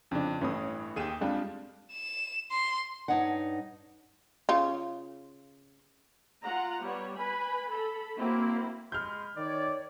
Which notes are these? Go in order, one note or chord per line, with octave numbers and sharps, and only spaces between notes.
F2 C#3 D4
A1 G2 E3 C#5 D#6
D#2 G4 G#4 D#7 E7
F2 G3 G#3 D4 F5
E7
C6
G2 D#4 C#5 D#5 F#5
C#3 F4
F4 F#5 A#5
G3 B3 C#5
B4 G#5 B5
A4 B5
F#3 A#3 C4 E4
G#3 B5 C6 F6 G6
D#3 C#5 D5